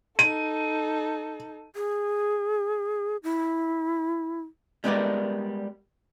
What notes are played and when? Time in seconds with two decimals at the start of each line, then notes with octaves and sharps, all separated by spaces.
0.19 D#4 A4 D#7
1.74 G#4
3.24 E4
4.84 G3 G#3 B3 G4 A#4 D5